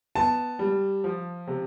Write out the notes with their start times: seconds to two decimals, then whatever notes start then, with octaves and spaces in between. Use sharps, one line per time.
0.15 B3 A5
0.59 G3
1.04 F3
1.47 C3